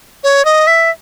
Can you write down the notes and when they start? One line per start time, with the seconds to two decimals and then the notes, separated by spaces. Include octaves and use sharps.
0.24 C#5
0.45 D#5
0.67 E5